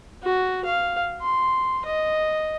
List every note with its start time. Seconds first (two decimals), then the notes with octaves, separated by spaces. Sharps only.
0.23 F#4
0.65 F5
1.21 C6
1.85 D#5